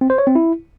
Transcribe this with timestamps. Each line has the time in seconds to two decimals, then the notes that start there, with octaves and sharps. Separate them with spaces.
0.01 C4
0.10 C5
0.18 C#5
0.27 C4
0.35 E4